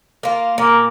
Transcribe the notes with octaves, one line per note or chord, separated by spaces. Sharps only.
A#3 F4
A#2 A#3